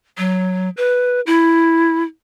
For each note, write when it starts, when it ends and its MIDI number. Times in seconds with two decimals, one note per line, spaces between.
0.18 0.70 54
0.77 1.21 71
1.27 2.02 64